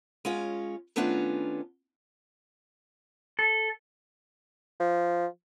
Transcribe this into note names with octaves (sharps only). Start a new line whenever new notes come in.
G#3 C#4 F4 C#5
D#3 A3 B3 C#4 D4 F4
A4
F3